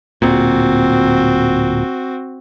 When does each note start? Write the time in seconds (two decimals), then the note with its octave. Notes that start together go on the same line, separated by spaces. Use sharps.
0.22 D1 A#2 C4 F#4